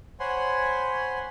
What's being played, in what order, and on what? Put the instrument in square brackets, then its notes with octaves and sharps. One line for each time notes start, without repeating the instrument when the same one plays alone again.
[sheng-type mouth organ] C5 C#5 F#5 G#5 B5 C6